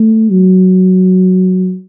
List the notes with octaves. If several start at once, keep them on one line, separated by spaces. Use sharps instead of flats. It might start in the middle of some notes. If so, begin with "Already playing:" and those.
Already playing: A3
F#3